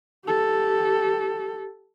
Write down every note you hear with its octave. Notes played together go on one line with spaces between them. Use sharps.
G4 A4